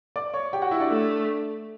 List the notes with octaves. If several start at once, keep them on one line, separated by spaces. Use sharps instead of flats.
D5 D6
C#5 C#6
G4 G5
F#4 F#5
E4 E5
D4 D5
A3